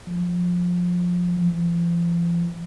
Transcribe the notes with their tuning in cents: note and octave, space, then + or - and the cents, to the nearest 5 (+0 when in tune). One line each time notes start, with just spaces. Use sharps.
F3 +20
F3 -40